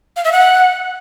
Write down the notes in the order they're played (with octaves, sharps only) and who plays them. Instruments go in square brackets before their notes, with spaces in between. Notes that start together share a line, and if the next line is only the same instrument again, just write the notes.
[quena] F5
E5
F#5